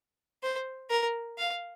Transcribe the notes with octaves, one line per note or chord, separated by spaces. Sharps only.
C5
A#4
F5